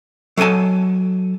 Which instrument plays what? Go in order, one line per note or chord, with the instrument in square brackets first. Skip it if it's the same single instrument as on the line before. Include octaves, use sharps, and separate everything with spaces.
[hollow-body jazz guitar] F#3 A4 F#5 G#5 A5